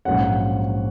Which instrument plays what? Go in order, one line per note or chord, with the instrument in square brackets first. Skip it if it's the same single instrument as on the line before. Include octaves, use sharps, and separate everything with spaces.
[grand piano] A#1 G#2 F#3 C#4 F#5